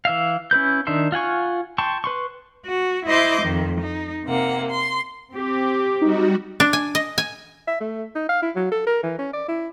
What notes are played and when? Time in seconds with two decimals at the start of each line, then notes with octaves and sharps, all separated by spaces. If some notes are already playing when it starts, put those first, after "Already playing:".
0.05 E3 E5 F5
0.51 C#4 E4 B4 G6
0.87 D#3 D4 D#4 E5 C6
1.12 F4 F#5 G#5 C#6
1.78 G5 A5 C6 C#6
2.04 B4 C6 C#6
2.66 F#4
3.06 E4 C5 D#5 C6 D6 G6
3.42 F2 D#3
3.81 D#4
4.26 C3 A#3 F#5
4.69 C6
5.33 C4 G4
6.02 G3 D#4 F#4
6.60 D4
6.73 G#5
6.95 D#5
7.18 G#5
7.67 E5
7.81 A3
8.15 D#4
8.29 F5
8.42 E4
8.56 F#3
8.72 A4
8.87 A#4
9.03 E3
9.19 C#4
9.33 D5
9.48 E4